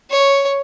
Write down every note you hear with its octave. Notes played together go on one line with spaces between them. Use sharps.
C#5